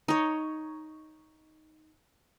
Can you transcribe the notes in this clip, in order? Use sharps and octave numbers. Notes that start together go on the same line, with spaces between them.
D#4 C#5